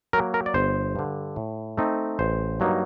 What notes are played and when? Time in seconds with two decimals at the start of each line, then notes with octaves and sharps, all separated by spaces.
0.13 F#3 A#3 A#4
0.34 A#4
0.46 D5
0.54 G1 C5
0.96 G2 D3
1.36 A2
1.77 A3 C4 D#4
2.19 A1 C5
2.60 G2 F#3 A#3 D#4